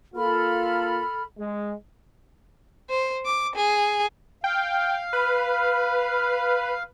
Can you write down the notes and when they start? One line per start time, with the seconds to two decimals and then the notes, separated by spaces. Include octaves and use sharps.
0.15 A#3 F4 A4 B5 F6
1.39 G#3
2.90 C5
3.25 D6
3.55 G#4
4.44 F5 G5
5.13 B4